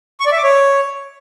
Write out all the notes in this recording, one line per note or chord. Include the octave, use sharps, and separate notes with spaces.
C#6
D5
E5
D6
C#5